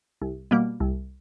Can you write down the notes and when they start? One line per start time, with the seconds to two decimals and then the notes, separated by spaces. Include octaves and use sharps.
0.22 C2
0.51 B2 G3 A#3
0.80 C2